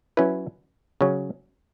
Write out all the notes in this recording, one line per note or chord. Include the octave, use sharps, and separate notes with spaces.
F#3 C#4 E4 B4
C#3 F#3 C#4